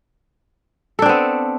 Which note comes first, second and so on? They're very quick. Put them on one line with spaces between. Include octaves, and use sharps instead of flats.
A4 D4 C4 B3